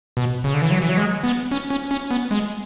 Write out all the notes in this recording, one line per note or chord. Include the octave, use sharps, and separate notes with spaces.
B2
C#3
D3
E3
F#3
E3
F#3
G#3
B3
C#4
C#4
C#4
B3
G#3